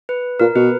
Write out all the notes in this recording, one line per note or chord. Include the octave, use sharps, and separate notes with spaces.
B4
A#2 A#4
B2 B4